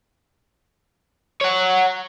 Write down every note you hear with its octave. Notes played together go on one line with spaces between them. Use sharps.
C#5 F#5